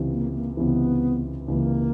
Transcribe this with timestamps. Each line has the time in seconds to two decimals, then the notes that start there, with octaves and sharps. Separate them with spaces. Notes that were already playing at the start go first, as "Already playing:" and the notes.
Already playing: C#2 C3 E3
0.11 A#3
0.34 A#3
0.57 C#2 C3 E3 B3
1.48 C#2 C3 E3 A#3